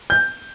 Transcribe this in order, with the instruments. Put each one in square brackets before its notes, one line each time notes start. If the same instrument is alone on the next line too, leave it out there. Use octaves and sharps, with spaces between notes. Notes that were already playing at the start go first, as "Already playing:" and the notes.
[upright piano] G6